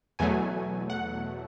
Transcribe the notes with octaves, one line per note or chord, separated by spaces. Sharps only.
E2 B2 F#3 A3 G#5
F#5